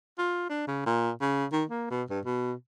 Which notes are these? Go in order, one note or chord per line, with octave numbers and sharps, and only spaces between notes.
F4
D4
C#3
A#2
C#3
D#3
A#3
B2
G2
B2